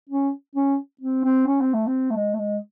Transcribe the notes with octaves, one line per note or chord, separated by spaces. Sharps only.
C#4
C#4
C4
C4
C#4
C4
A3
C4
A3
G#3
A3
G#3